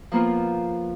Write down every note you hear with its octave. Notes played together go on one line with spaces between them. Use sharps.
F3 A#3 B3 F4